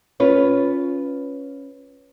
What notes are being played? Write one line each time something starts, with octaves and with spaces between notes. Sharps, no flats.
C#4 F4 B4